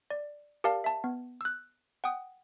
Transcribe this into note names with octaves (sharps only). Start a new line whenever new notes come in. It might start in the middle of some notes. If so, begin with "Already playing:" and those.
D5
G4 A#4 D5 F5 A5
E5 A5
B3
E6 F#6
F#5 G5 D#6